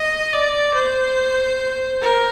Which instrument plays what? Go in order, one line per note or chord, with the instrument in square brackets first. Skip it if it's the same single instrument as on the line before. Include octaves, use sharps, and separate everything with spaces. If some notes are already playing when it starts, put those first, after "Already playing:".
Already playing: [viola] D#5
D5
C5
A#4